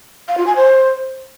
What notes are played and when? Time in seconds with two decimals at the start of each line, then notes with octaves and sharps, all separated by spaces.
0.28 F5
0.37 F4
0.47 G#5
0.56 C5